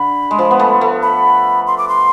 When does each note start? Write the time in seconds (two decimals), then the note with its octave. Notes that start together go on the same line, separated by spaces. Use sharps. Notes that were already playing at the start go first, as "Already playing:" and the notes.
Already playing: D3 B5
0.31 G#3
0.39 F3
0.51 B3
0.60 A3
0.81 A3
1.03 B5
1.67 C6
1.78 D6
1.89 C6